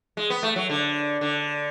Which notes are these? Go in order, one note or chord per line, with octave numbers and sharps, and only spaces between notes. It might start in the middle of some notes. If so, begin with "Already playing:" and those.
G#3
B3
A3
F#3
D3
D3